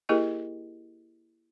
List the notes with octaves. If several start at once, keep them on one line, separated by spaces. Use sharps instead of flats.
A#3 E4 G4 G#4 A#4 D#5